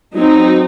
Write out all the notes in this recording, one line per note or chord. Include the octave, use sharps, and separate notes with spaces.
F#3 C4 D#4